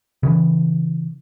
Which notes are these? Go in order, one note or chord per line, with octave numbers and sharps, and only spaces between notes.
C#3 E3